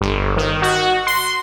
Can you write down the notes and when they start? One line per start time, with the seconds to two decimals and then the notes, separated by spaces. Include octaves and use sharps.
0.01 G1
0.37 D#3
0.62 F#4
1.07 C6